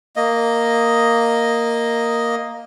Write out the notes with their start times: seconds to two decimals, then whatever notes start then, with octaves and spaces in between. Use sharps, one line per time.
0.16 A#3 D#5